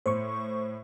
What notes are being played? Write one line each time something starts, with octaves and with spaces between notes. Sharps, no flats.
A2 C5 C#6